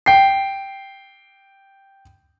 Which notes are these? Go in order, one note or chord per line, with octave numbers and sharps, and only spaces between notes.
G5 C7